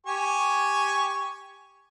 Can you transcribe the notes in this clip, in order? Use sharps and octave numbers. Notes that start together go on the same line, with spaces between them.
G4 G#5 C#6